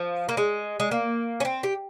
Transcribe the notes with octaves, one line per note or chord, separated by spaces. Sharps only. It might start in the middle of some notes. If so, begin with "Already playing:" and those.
Already playing: F3
A#3
G#3
G#3
A#3
C#4
C4
G4